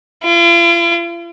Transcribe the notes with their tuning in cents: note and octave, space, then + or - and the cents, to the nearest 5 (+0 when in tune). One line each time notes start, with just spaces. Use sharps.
F4 -45